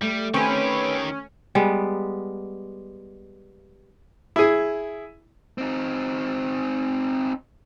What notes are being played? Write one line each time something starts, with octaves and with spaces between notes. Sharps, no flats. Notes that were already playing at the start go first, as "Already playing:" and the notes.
G3 A3
D#3 C4 C#4 G4 B4
G3 G#3 B3
E4 G#4
C4 D#4